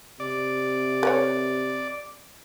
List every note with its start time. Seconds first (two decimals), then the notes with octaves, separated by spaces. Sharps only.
0.20 C3 D5
1.03 A#4 B4 C#5